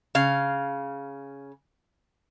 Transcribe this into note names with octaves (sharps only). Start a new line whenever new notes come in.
C#3 F5